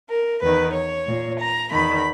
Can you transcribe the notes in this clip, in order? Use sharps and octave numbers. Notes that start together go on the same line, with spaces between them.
A#4
E2 D#3 B4
C#5
A#2
A#5
E2 D#3 B5